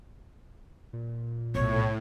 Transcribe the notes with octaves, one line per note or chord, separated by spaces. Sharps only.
A#2
B1 A2 G#3 C#5